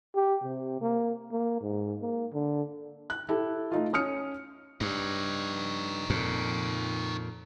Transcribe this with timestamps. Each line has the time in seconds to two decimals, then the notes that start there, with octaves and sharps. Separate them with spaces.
0.15 G4
0.44 C3
0.81 A#3
1.31 A#3
1.61 G#2
2.01 A#3
2.33 D3
3.10 F#6
3.29 E4 G4 A4
3.72 A3 D#4 F4
3.93 C#4 D#6 F6 C#7
4.81 G2 D#4 C#5
6.10 F2 A#2